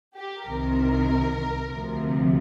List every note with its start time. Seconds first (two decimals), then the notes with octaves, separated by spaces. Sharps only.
0.16 G4
0.47 C2 C3 D#3 A#4
1.69 D2 C3 F3